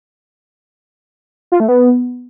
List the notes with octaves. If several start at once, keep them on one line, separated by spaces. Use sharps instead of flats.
F4
A3
B3